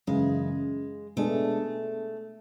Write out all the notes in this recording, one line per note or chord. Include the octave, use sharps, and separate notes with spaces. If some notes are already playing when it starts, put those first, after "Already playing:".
F#2 C#3 E3 G#3
B2 G#3 A3 D4 G#4